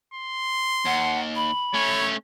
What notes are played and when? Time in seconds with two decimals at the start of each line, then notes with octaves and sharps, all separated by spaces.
0.14 C6
0.86 D#2 F#5
1.35 B5
1.74 A3 C#4 C#5